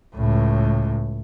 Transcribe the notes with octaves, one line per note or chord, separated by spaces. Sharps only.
C#2 A2